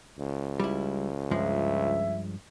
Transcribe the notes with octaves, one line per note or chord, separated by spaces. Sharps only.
C#2
G3 E4
G2 F3 G#3 E5